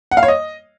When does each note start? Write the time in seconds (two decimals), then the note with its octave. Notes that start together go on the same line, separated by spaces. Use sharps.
0.11 F#5
0.17 F5
0.23 C#5
0.28 D#5